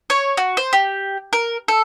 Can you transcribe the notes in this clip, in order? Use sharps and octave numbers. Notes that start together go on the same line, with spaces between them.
C#5
F#4
C5
G4
A#4
A4